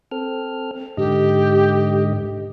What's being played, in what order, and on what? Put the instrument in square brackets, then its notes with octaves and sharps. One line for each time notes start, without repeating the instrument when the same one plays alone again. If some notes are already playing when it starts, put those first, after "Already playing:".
[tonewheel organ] C4 A4 F6
[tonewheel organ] G#2 D3 D#5 [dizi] G4